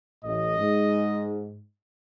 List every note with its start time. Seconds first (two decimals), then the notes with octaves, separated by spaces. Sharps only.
0.25 A1 A2 D#5
0.59 G#2